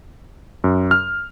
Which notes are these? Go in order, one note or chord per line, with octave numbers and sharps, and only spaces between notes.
F#2
F6